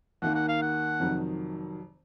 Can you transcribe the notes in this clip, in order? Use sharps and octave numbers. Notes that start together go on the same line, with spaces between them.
D#2 D#3 A#3 F#5
F#5
F5
F#5
F1 F2 D#3 F#3